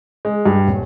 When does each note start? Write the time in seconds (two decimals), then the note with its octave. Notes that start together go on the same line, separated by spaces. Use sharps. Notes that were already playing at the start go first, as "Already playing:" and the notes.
0.25 G#3
0.45 G2
0.67 D#1